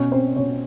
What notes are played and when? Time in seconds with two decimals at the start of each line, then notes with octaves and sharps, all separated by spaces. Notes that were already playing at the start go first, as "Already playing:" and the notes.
Already playing: B2 C#4 C#5
0.12 C4 C5
0.36 B2 C#4 C#5